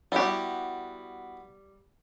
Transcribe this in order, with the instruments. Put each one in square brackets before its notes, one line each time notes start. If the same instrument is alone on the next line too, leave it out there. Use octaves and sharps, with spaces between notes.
[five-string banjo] G3 G4 [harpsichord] B3 E4 F#4